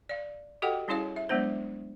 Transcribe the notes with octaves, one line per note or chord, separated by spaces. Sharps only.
D5 F5
F#4 G4 A4 D#5 F#5 G5
G3 C#4 E4 G#4 C#5 F5
E5
F#3 G#3 B3 D4 C5